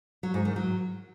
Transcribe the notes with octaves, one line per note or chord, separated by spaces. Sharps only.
F#3
G#2
D#3
F#3